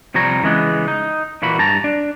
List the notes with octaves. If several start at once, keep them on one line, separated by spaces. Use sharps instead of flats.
C3 F3 G3 C#5 A#5
C#3 E3 G#3 B3
D#4
A#2 E3 A#3 F#4 B5
G2 A5 A#5
D4